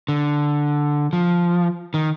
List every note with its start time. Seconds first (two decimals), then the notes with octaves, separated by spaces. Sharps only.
0.08 D3
1.13 F3
1.94 D#3